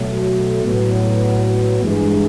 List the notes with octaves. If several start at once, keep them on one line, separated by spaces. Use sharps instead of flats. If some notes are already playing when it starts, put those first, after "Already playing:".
Already playing: B2 F#3 A3
A2 F#3 B3
G2 E3 G#3